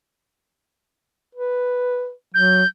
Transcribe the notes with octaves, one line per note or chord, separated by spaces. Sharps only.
B4
F#3 G6